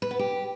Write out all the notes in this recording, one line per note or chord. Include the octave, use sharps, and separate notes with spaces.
B4
B3
G4